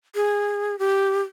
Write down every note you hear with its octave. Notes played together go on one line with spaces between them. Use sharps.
G#4
G4